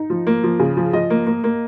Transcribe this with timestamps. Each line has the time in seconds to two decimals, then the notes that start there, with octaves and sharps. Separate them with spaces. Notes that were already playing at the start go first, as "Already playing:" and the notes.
Already playing: D#4
0.10 F3
0.27 A#3
0.44 F3
0.59 C#3
0.77 F3
0.93 F3 D#5
1.10 A#3
1.27 A#3
1.44 A#3